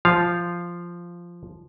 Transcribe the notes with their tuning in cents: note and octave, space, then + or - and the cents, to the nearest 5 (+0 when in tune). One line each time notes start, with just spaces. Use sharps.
F3 -5 F5 +0